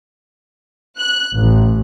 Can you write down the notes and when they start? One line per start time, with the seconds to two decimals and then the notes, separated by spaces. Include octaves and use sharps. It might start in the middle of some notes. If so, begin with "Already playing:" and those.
0.98 F#6
1.36 A1